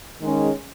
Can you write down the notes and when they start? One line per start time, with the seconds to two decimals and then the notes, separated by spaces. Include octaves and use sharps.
0.21 D#3 G#3 C#4